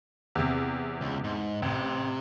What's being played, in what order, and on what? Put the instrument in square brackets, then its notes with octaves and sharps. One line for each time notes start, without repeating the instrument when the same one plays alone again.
[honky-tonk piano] E2 C3
[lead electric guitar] C#2
G#2
[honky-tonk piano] A1 [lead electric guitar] C3